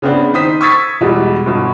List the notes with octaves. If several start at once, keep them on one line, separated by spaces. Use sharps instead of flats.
C#3 B3 C4 D4
D#3 C5 D#6 B6
C#6 D#6 E6 G#6 A6 B6
E2 B2 G3 G#3
G1 B2